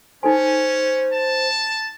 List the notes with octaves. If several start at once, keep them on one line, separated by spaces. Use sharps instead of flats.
C#4 D#4 A4 C5 G#5
A5